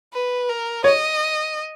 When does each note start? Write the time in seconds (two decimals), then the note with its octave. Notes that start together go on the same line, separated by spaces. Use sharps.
0.14 B4
0.49 A#4
0.84 C#5 D#5